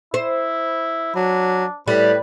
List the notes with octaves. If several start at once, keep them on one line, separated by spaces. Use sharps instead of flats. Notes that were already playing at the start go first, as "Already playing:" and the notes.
E4 C5
F#3 D4
A2 G3 B4